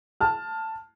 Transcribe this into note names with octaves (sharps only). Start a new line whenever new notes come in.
A5 F6